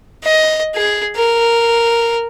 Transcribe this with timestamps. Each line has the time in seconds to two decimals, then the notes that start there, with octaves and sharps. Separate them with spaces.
0.24 D#5
0.75 G#4
1.16 A#4